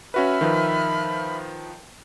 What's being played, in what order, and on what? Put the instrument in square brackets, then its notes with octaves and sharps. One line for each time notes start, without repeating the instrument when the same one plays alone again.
[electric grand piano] C#4 F#4 B4 [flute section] E5 B5 F6
[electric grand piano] D#3 F3 B4